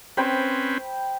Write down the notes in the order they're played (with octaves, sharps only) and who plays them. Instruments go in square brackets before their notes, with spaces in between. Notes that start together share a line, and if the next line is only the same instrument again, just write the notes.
[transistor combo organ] C4 C#4 B4 [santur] C5 G5 B5